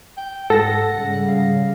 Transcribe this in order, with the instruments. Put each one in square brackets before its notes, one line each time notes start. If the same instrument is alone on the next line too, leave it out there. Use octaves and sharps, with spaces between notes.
[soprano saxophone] G5
[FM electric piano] G#2 A#6 [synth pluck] A4 [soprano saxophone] F#5
[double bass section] C#3 G3
[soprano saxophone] F5